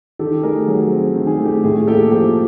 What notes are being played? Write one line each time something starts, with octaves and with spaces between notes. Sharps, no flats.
D#3 G4 A4
A3 G#4 A#4
F#3 G#4
C4
D#3
G#4
A3
G4
A2 G#4
A#3 G4 A4
F3 G4